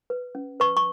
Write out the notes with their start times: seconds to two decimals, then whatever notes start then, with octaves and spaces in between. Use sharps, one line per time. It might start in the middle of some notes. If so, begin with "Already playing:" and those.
0.10 B4
0.35 C#4
0.60 B4 C#6
0.77 C#6